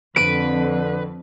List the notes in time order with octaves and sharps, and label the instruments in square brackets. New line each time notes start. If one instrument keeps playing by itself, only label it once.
[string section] F2 [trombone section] D3 [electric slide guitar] B4 [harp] D7 D#7